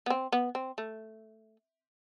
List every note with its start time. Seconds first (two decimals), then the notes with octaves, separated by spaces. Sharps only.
0.06 B3
0.10 C4
0.32 B3
0.55 C4
0.78 A3